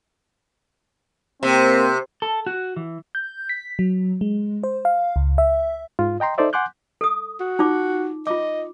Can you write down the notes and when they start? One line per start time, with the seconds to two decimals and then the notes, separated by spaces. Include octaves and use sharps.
1.43 C3 A#3 C4
2.22 A4
2.47 F#4
2.76 E3
3.15 G6
3.49 B6
3.79 F#3
4.21 G#3
4.64 C5
4.85 F5
5.16 C#2
5.38 E5
5.99 G#2 F4
6.20 D#5 G5 A#5 C6
6.38 D#4 A4 C5 D5 E5
6.53 F#5 G#5 C6 D6 F#6 G6
7.01 A4 D#6
7.40 F#4
7.59 D#4 F4 D6
8.27 F4 D#5 D6